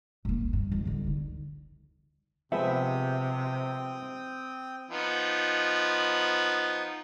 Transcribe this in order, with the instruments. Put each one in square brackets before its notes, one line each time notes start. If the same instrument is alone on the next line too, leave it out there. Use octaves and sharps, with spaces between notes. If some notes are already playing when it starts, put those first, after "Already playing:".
[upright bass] A#1 A#3
C2
G2
F3 G#3
D3 G3
C#2 D#4
[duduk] C3 [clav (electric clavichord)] F3 G#3 B3 [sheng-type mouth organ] C4 G5 D#6 [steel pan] E5
[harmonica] F3 B3 D#4